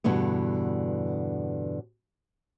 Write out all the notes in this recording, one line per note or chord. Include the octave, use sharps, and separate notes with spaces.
E2 G2 B2 D3 B3